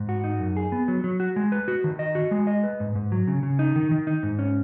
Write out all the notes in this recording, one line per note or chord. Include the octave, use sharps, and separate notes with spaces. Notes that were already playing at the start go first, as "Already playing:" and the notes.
Already playing: G#2
F#4
D#4
F#2
G#4
B3
F#3
F#3
F#4
G#3
B4
F#4
D#3
D#5
F#4
G#3
D#5
B4
G#2
G#2
F#3
C#3
C#3
D#4
D#3
D#3
D#4
G#2
C#4